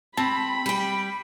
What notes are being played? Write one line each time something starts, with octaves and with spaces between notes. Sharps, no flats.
C4 A5 B5
G3 G5